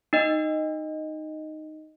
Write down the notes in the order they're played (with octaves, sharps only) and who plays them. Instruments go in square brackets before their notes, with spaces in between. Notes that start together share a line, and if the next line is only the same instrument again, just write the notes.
[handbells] D#4 D#5